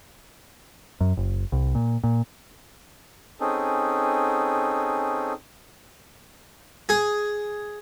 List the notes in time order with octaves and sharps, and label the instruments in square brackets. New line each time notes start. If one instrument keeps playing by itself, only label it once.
[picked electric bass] F#2
F#1
C2
A#2
A#2
[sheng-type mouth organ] C4 C#4 D#4 G#4 A4
[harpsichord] G#4